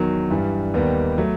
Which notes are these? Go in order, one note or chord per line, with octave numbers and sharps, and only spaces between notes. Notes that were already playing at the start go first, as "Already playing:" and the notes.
Already playing: E2 D#3 F#3
G2 E3 G3
D#2 D#3 G3 B3
F#3 A3